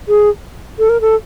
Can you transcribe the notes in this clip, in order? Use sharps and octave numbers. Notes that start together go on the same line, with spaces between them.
G#4
A4
A#4
A4